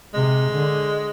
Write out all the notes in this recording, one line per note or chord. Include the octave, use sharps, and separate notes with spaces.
C3 G#3
D3